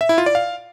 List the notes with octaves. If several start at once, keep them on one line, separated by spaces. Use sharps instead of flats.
E5
E4
F4
D5
F5